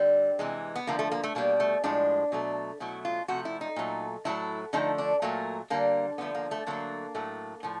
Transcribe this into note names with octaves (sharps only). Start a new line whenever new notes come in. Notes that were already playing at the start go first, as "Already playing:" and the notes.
Already playing: D3 G3 C4
C3 E3 G#3
B3
D3 F3 A3 A#3
A3
A#3
A3
B2 G3 A#3
A3
A2 F3 G#3 D4
B2 F#3 A3
B2 F#3 A3 E4
F4
C3 F3 A3 F#4
E4
D#4
A#2 F#3 A3
A2 F#3 A3 E4
D3 F3 A3 D#4
D4
A#2 F#3 A3 A#3
D3 G3 A#3
D3 F3 A3 B3
A#3
A3
D3 F#3 A3 A#3
A2 F#3 A3
A2 F3